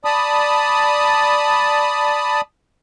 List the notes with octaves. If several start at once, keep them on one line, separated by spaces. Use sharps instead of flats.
D5 A5 B5 D#6